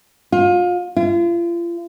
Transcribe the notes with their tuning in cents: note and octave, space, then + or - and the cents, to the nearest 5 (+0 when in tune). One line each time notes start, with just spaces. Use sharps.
F4 +30
F4 -40